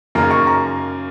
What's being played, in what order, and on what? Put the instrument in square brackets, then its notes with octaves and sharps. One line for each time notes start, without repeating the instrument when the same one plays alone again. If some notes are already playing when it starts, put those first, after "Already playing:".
[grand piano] F#2 C#3 A#3 D#4 [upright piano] A#5
[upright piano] C#6
A#5